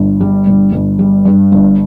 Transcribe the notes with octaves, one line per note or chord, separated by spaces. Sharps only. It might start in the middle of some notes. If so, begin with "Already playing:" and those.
Already playing: G1
G3
G1
G1
G3
G2
G1